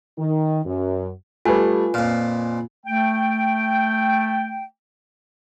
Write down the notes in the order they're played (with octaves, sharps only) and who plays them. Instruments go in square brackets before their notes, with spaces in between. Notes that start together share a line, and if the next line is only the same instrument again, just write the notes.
[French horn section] D#3
F#2
[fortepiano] G3 A3 [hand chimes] F4 [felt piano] B4 G#5
[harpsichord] F2 A#2 [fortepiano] F5
[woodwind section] A3 G5